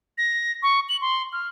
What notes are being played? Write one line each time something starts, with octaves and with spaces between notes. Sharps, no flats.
A#6
C#6
F#7
C6
F6